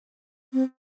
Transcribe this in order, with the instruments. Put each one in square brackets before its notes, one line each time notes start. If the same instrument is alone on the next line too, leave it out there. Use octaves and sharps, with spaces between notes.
[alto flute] C4